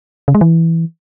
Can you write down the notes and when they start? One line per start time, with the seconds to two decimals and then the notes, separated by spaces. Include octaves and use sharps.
0.28 C#3
0.35 G#3
0.41 E3